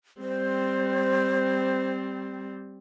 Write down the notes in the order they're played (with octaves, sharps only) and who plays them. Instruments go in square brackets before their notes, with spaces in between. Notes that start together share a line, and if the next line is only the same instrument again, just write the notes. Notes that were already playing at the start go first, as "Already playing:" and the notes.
[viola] G3 C4 [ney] C5